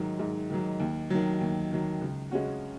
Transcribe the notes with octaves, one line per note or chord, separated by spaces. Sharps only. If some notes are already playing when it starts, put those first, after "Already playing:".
Already playing: G#2 D#3 F#3
G#2
D#3 F#3
D#2
D#3 F#3
D#2
D#3 F#3
C#2
C#3 G#3 C#4 F#4